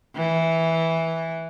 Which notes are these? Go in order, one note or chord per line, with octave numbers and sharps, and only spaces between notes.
E3